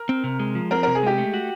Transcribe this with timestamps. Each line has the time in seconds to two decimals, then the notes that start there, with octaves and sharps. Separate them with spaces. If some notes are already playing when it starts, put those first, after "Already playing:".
Already playing: A#4
0.09 C4
0.24 C3
0.39 G#3
0.55 F3
0.71 C4 A#4
0.83 C3 A#4
0.95 G#4
1.03 G#3 G4
1.18 A3
1.34 F#4